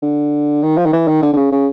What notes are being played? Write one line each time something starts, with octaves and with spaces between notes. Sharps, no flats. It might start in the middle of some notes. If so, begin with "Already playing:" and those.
D3
D#3
F3
D#3
E3
D#3
D3
D3
C#3
C#3